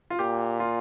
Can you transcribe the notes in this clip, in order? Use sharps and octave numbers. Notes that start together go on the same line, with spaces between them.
F4
A#2 G4
F4